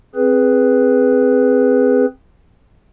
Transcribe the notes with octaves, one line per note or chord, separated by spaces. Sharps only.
C4 G#4 B4